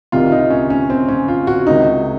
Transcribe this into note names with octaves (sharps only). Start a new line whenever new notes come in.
C2 C3 D#3 F4
D#4
C#4
C#4
C4
C#4
F4
F#4
C#2 C3 D#3 D#4